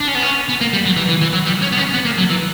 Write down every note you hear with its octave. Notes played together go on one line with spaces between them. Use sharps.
D4
C#4
B3
C#4
B3
A#3
G3
F#3
E3
E3
E3
F#3
G3
C#4
B3
C#4
B3
A#3
F#3
E3